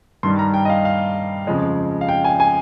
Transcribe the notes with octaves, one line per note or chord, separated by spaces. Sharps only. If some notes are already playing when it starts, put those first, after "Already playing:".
G2 D#3 G3 C6
A#5
G5
D#5
F5
F5
F2 C#3 F3 G#3
F5
G5
G#5
G#5